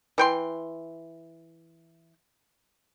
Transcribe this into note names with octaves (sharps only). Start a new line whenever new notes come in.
E3 G5 C6